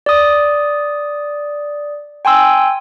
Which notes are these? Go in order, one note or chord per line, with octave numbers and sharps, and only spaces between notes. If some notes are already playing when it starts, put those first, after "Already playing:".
D5 D#6
G5 G#5 C6 E6